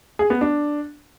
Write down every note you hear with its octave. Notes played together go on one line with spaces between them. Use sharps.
G#4
B3
D4